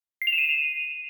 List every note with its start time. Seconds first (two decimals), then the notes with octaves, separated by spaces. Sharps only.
0.22 C7
0.27 F7
0.33 E7
0.38 D#7